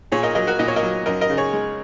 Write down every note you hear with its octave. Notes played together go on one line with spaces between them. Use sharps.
A#2 G#4 C#5
A#4 D#5
F#3 A#4 D#5
F#4 A#4
A#2 D#5
C#5
A#4 D#5
F#3
F#2 A#4 D#5
A#4 D#5
C#3
G#4 C#5
G#3